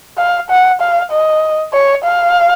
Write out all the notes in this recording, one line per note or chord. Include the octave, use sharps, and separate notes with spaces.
F5
F#5
F5
D#5
C#5
F5